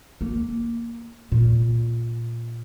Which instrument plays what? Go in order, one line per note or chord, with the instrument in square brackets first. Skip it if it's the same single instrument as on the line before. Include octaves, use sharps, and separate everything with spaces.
[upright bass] A#3
A#2